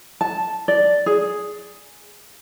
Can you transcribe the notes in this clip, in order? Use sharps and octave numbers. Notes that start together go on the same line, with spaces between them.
A5
D5
G#4